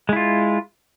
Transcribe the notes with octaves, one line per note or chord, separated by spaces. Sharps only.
G#3 E4 F4